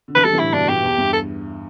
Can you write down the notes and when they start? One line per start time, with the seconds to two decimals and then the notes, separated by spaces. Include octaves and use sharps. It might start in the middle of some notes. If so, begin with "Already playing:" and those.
0.08 D3
0.15 E3 B4
0.24 D3 G3 A4
0.33 E3
0.38 A2 D3 E4
0.53 G2 B2 D4
0.68 G2 G4
0.83 E2
0.98 G2
1.13 A4